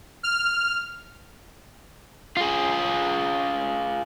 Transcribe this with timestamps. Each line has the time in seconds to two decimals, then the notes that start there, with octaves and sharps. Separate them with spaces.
0.23 F6
2.37 F4 G#4